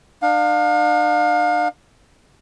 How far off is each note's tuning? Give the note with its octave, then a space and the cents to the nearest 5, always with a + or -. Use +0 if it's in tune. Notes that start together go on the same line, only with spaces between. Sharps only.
D4 +40 F5 +30